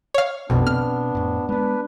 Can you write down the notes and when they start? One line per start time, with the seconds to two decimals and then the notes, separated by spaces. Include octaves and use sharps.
0.14 C#5 F5
0.50 B1 F2 B2 B3 D4
0.67 B2 C4 F6
1.15 F2 A2
1.49 G#3 B3 D4 B4